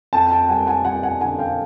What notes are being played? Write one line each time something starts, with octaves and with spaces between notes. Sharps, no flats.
F2 G5 A5
G5 A5
G3 F#5 G#5
F#5 G#5
G3 F#5 G#5
F#5 G#5
D3 F#5 G#5
F5 G5